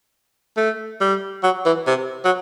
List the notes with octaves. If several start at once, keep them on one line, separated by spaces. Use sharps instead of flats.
A3
G3
F#3
E3
C3
F#3